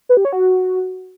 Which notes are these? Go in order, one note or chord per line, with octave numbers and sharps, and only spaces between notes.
B4
G4
C#5
F#4